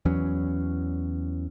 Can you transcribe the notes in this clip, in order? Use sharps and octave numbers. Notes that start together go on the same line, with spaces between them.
E2 E3 F#3 C#4